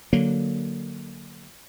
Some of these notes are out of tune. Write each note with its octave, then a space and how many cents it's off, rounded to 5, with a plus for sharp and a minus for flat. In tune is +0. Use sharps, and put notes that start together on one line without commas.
D3 +0 F#3 +0 A#3 +0